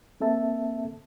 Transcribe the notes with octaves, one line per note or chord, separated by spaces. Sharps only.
A#3 C4 A4 E5 A5